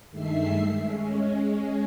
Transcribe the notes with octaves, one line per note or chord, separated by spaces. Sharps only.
G2 D#3 G#3 A3 E5 C7
G#3 C#4